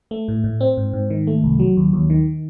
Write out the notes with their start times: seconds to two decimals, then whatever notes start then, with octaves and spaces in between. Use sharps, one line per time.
0.11 A3
0.28 A2
0.44 A2
0.61 C4
0.77 G#2
0.93 G#2
1.10 D#3
1.27 A3
1.44 C2
1.60 F#3
1.77 D#2
1.93 D#2
2.10 D#3